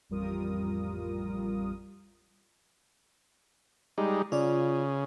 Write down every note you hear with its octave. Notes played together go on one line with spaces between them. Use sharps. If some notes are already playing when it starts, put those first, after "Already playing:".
A1 F2 G3 F4 A#4 D#6
G3 G#3 D#4
C#3 F4 D5